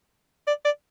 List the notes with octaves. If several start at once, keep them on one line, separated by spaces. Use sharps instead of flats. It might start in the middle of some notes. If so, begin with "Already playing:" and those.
D5
D5